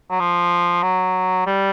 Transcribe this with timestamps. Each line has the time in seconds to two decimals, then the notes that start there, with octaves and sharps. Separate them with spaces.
0.11 F#3
0.20 F3
0.83 F#3
1.47 G3